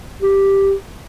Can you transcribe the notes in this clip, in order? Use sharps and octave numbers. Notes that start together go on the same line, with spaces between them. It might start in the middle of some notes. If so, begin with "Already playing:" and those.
G4